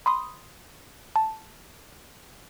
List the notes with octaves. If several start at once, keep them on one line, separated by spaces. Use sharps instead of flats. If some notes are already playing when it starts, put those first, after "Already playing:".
B5 C6 D#6
A5